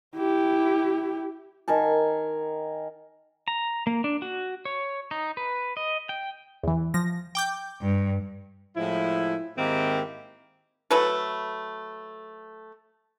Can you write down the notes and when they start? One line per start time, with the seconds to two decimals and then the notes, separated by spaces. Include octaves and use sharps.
0.16 E4 G4
1.68 D#3 A#4 G#5 A5
3.48 A#5
3.87 A#3
4.04 D4
4.22 F#4
4.65 C#5
5.11 D#4
5.37 B4
5.77 D#5
6.09 G5
6.63 E2 E3
6.94 F3 A#6
7.35 G5 D6 G6
7.81 G2
8.77 A2 F3 G#3 E4
9.58 G#2 D#3 A#3 C4 E4 G4
10.90 F#3 A3 A4 B4